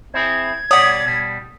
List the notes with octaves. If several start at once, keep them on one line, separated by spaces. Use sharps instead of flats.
C4 E4 G#4 G#6
B2 G3 C#5 D5 F#5 D#6
B2 G3